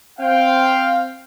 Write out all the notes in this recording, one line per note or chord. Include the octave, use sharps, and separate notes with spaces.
C4 F5 G5